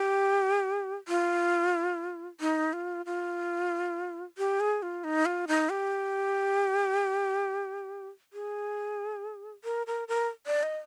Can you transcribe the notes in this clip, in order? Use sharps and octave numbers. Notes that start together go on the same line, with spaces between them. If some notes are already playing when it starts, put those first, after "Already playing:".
Already playing: G4
F4
D#4
F4
F4
G4
G#4
F4
D#4
F4
D#4
G4
G#4
A#4
A#4
A#4
D5
D#5